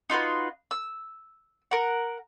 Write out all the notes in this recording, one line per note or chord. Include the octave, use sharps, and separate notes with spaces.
D#4 F4 F#4 B4
E6
A#4 F#5